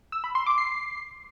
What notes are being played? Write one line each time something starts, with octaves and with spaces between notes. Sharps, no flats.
E6
B5
C6
D6
C7